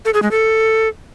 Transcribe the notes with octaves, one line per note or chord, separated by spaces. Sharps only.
A4
G#4
G#3
A4